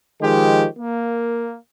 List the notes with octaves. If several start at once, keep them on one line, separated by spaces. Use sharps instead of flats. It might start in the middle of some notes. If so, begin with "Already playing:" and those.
D#3 F3 G#3 G4
A#3